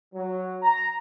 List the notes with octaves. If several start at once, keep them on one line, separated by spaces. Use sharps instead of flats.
F#3
A#5